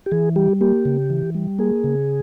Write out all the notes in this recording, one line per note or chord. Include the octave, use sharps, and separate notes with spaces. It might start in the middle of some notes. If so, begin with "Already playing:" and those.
G4
E3 G#4
G3 G4
A#3 G4
C#3
E3
G3
A#3 G#4
C#3